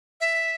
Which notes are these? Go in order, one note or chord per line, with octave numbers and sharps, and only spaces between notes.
E5